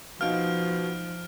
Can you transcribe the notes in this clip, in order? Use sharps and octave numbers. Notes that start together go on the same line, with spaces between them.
B2 F3 D#4 F5 F6 D7